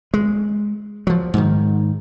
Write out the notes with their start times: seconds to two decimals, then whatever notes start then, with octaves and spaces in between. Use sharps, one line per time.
0.14 G#3
1.07 F3 F#3
1.34 G#2 D#3